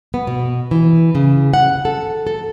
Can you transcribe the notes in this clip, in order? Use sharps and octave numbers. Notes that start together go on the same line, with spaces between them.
B3
B2
E3
C#3
F#5
A4
A4